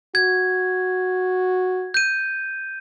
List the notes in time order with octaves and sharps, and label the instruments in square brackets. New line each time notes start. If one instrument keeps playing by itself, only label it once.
[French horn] F#4 [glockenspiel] G#6
[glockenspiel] G6 D#7